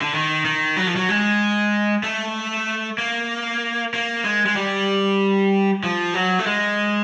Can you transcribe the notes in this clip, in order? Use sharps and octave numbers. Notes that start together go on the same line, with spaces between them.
D3
D#3
D#3
F#3
F3
F#3
G#3
A3
A#3
A#3
G#3
G#3
G3
F3
F#3
A3
G#3